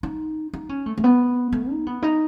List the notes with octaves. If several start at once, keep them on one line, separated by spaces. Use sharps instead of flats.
D#4
D#4
C#4
A3
A3
B3
A3
D#4
B3
D#4